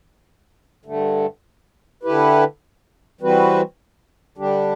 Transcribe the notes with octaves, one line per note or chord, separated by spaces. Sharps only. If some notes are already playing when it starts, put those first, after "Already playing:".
G2 D3 A3
D3 A3 E4 G4 B4
E3 G3 C4 F#4 B4
D3 G3 D4 G4